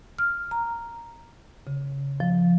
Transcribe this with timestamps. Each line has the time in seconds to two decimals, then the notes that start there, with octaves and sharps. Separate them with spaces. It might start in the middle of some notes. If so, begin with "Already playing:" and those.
0.19 F6
0.51 A#5
1.67 C#3
2.20 F3